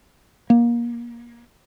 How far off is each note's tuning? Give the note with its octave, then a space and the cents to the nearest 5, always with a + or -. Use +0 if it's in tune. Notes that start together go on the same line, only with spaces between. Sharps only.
A#3 +25